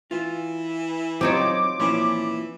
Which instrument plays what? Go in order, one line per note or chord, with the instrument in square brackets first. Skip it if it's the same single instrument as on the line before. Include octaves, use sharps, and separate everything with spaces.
[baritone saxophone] E3 [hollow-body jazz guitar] F4
[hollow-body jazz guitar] F#3 F4 G4 [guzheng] C4 D#4 C#5 [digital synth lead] D6
[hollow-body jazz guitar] A#2 F3 C#4 [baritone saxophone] E3